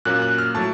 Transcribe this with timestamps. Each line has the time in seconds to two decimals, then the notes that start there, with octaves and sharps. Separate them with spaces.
0.05 A#2 F#3 A#3 C#4 F#6
0.22 F#6
0.38 F6
0.55 A2 F#3 A5